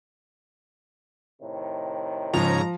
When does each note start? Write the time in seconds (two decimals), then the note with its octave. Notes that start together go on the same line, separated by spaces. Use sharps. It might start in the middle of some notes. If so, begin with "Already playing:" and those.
1.42 A2 C3 D#3
2.33 G#2 C#3 F3 A#5